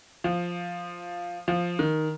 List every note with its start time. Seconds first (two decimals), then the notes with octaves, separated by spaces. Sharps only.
0.24 F3
1.48 F3
1.79 D#3